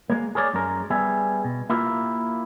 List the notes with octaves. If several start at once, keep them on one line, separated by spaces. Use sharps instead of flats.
G#3 A#3
G#4 A#4 C#5 D5
F#2 G#3 A#4
G3 B3 G#4 E5
B2
A#3 E4 F4 G4 A#4